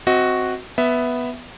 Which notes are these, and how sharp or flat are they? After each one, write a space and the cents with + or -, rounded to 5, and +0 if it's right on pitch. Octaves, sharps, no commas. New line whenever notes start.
C4 -5 F#4 +0 D#5 +25
B3 +0 E5 +0